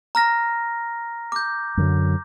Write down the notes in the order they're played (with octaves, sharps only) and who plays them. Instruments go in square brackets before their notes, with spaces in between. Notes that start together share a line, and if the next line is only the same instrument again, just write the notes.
[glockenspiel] A#5 F6 A#6
D6 G6
[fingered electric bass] F#2 D3 F#3